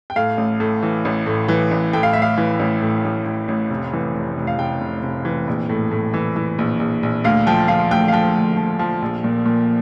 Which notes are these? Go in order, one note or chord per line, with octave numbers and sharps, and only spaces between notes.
G5
A2 F5
A1
A2
E3
A1
A2
E3
A1
A2 G5
F5
A2 E5
F5
E3
A1
A2
A1
A1
A1
F1
E3
F1
F1
F5
F1 G5
F1
F1
E3
A#1
A2
A2
E3
E3
A#1
A#1
A#1
D2 F5
F3 G5
F3 F5
D2 G5
F5
F3 G5
D2
F3
F3
A#1
A#2
A#2